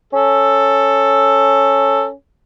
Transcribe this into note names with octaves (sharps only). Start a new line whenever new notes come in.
C#4 A4